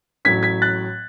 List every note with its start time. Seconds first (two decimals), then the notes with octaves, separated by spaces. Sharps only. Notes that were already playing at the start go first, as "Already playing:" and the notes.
0.25 A1 A2 F#3 G#6 B6
0.43 G#6 B6
0.62 F#6 A6